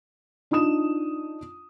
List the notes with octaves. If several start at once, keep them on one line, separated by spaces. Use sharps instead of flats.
D4 D#4 F4 D#6 E7